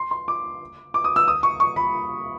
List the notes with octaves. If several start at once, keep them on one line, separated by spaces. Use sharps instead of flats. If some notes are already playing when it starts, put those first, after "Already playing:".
Already playing: C6
C6
D6
D6
D#6
E6
D#6
C#6
C#6
B5